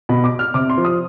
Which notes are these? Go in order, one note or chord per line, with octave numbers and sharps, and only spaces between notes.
B2 B5
D6
F6
C3 D6
C6
F3
D#6